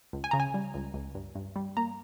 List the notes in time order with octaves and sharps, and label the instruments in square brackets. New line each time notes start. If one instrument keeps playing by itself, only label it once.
[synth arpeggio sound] C#2
G#5
C#3 A#5
G#5
G3
C#2
C#2
G2
G2
G3
A#3 A#5